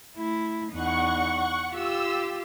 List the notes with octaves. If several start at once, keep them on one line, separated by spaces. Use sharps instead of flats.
A3 E4
E2 D#4 F#5 C#6
F4 G4 E6